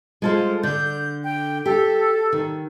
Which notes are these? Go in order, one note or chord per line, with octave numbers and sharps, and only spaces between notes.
G#3 F4 A4 C5
D3 G6
G5
G4 A4
D#3